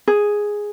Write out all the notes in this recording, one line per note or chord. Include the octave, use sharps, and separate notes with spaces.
G#4